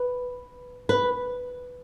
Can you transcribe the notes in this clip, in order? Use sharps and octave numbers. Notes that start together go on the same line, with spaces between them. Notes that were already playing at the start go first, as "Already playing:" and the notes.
Already playing: B4
B4